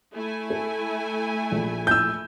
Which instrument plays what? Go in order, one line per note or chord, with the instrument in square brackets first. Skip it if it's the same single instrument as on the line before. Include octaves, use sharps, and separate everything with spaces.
[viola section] A3 E4 G#5
[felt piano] A4
A#1
[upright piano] E6 G6